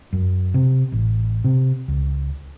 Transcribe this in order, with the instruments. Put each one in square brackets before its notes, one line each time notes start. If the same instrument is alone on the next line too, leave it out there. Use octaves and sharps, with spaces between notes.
[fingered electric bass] F#2
C3
A1
C3
C#2